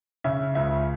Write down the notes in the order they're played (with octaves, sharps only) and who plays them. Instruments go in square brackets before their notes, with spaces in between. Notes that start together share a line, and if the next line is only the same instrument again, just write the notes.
[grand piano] C#3 E5
C#2 E5